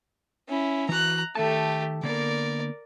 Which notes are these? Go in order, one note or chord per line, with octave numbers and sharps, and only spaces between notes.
C#4 E4
E3 F#4 A#5 F#6
D#3 A3 G4 A4 A5
D3 A#3 B3 A#4 D5